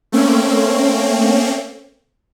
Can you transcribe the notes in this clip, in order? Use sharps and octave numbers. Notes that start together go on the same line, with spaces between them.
A3 A#3 C4 C#4